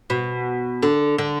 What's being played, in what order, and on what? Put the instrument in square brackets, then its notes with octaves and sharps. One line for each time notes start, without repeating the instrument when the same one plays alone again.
[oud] B2
D3
D3